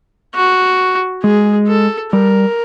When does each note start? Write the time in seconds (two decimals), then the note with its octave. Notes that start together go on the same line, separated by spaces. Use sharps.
0.35 F#4
1.23 G#3 G#4
1.68 A4
2.13 G3 A#4